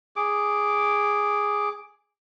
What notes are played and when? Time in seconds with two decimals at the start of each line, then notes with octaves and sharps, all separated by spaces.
0.16 G#4 D6